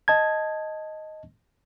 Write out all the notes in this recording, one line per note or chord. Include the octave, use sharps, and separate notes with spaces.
D#5 A5 G#6